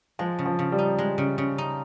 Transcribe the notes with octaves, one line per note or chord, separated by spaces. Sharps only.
F3 G#3
C#3
F3
C#3
G3
D#4
G#3
C#3
C#3
D#4